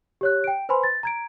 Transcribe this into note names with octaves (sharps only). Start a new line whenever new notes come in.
G4 C#5 F#6
G5 D7
B4 C5 G#5 B5 C6
A6
A#5 G#6 D7